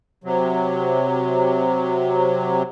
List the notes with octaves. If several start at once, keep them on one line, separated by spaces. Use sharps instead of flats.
C3 F#3